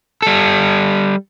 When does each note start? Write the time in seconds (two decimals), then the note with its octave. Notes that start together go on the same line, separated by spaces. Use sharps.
0.22 G3 A4